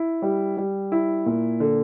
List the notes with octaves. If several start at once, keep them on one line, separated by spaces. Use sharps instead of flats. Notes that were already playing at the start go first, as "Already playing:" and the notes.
Already playing: E4
G3
G3
E4
A#2
D3